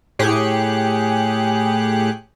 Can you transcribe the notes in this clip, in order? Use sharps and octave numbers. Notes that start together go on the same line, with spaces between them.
A2 G4 G#4 F#6 C#7